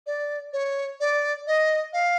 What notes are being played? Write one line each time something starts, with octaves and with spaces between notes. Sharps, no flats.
D5
C#5
D5
D#5
F5